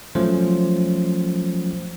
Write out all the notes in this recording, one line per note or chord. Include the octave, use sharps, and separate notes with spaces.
F3 F#3 A3 C#4 F4 C5